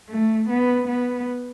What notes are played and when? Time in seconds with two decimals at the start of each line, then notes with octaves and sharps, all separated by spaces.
0.09 A3
0.49 B3
0.88 B3